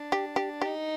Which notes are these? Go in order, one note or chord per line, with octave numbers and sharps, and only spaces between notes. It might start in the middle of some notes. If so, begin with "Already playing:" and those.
Already playing: D4
G4
G4
D#4 G4